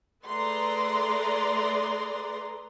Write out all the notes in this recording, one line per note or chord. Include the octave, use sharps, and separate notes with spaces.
A3 G#4 B4 D5 A#5 C6